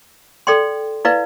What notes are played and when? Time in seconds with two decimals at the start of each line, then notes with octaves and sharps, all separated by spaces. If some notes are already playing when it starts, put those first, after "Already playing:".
0.47 A4 D5 G5 C6
1.05 E4 B4 D5 F5